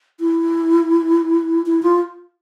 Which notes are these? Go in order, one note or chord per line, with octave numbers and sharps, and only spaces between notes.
E4
E4
F4